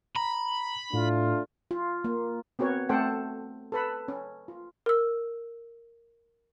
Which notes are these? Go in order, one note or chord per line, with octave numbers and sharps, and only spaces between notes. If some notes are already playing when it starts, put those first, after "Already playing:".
A#5 B5
A2 A3 D4 F4
F4
A#3
B3 C4 F#4 A#4 C#5
A3 C4 A4 C5 F#5 G5
A4 B4 B5
C#4
F4
A#4 E6